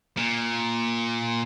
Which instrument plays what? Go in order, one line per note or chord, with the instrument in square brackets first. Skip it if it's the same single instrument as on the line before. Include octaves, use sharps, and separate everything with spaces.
[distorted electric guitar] A#2